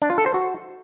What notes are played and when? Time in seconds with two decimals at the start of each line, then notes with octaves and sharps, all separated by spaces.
0.02 D4
0.10 F4
0.18 A4
0.26 C5
0.34 F#4